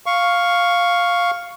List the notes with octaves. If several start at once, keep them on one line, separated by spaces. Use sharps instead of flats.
F5 C#6